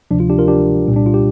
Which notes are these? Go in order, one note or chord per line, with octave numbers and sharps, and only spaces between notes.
D2 C3 F3 D4
F4
D4 G4
F4 A#4
D4 G4
C2 A#2 G3
D4
F4
G4